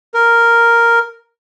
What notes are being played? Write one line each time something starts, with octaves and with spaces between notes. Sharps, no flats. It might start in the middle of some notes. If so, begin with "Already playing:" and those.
A#4